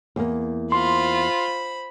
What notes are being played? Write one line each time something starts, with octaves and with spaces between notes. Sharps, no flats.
E2 A#3
F4 C5 B5 C6